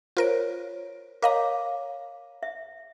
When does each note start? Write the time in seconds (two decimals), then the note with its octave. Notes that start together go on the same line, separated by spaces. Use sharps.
0.17 F4 A#4 C5 C#5 D7
1.22 A#4 C#5 D#5 F5 A#5 D6
2.43 E5